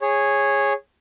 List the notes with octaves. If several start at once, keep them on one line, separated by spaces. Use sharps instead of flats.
G#4 C#5